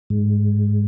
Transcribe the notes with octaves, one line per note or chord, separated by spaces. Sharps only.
G#2